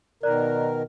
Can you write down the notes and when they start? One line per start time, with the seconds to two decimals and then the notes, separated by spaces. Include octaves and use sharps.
0.23 B2 D#3 A#4 D5 F#6